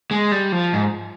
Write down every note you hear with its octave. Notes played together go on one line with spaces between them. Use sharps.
G#3
G3
F3
G#2